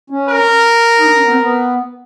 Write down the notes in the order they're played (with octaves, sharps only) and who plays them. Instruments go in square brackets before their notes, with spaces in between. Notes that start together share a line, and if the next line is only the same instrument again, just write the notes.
[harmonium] C#4
[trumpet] A#4
[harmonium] D#4
D4
C#4
B3
C4
B3